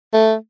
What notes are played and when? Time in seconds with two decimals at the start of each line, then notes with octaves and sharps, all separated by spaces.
0.13 A3